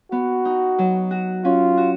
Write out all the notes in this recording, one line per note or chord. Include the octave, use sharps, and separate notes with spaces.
B3 F#4
D#4
F#3
F#4
C#4 F4
F#4